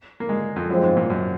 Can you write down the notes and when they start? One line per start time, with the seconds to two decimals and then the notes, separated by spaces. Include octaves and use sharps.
0.20 A#3
0.29 G#3
0.56 F2
0.69 F#2 F3 G#3 C4
0.83 G#2
0.97 A#2
1.10 F#2